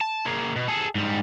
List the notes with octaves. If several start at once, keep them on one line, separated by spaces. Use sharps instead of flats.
A5
A#3 G#4
B2
G#4 A4
G#2 G3